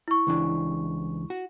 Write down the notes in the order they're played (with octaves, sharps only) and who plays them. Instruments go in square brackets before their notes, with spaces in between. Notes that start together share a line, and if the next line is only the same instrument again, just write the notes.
[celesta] E4 C#6
[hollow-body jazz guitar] C#2 E3 D4
F#4